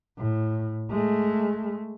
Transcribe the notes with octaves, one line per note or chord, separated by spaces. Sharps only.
A2
G#3 A3